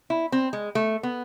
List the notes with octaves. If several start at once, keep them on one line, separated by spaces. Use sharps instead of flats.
E4
C4
G#3
A3
B3